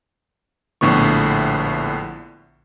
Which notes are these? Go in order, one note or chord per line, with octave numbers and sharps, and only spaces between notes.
A#1 A2 D3 B3 C#6